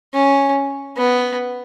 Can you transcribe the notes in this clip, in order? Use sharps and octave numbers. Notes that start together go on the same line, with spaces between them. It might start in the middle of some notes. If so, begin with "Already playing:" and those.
C#4
B3